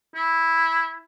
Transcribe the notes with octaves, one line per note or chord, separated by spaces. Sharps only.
E4